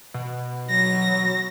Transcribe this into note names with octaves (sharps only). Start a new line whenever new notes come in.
B2
F#3 A#6